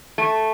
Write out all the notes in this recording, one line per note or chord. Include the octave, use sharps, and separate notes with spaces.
A3